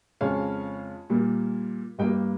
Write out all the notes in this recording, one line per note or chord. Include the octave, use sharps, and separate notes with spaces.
F2 C#3 G#3 C#5 F5
A#2 G3 A#3
G2 G3 A#3 D#5 G5